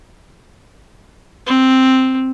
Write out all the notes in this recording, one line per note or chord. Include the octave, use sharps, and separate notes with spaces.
C4